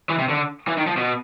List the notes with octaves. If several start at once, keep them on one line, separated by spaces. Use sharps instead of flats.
E3
C3
D3
E3
D#3
F3
B2